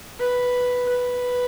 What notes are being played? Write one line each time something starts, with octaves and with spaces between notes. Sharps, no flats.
B4
B4